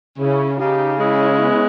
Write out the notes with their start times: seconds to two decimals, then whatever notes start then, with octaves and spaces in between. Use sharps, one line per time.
0.18 C#3 C#4 E4
0.59 C#3 D#4 G4
0.99 G#3 C#4 E4
1.40 B3